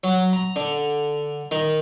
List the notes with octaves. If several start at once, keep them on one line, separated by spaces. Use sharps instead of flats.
F#3
A#5
D3
D#3